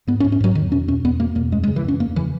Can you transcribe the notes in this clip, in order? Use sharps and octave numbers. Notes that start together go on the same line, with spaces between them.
G#2 B3
C#4
G#2
C#4
G#2 F#3
E2 D#3
B2 C#4
E2 C#4
E2 B3
B2 A#3
E2 A#3
F#2 G#3
G#3
C#3
E3
F#2 C#4
E2 A#3
C#3 E3